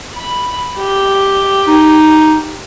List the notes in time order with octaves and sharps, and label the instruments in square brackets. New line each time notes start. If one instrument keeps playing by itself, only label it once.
[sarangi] B5
G4
[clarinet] D#4